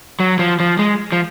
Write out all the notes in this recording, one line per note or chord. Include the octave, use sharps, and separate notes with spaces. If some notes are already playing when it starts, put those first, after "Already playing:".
F#3
F3
F3
G#3
F3